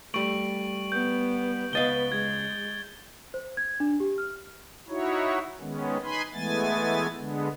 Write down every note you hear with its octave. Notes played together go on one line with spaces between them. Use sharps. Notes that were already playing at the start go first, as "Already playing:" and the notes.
G3 A3 C#6 D7 F#7
B3 G6
C#2 B3 B4 D#5 F5 A6 G7
G#3 G#6
C5
G#6
D4
G4
F6
D#4 E4 F#4 C#5
D#3 G#3 B3 C#4
D#4 B4 G#5 B5 C6
E3 G#3 A3 B3 G#5 A6
D3 G#3 B3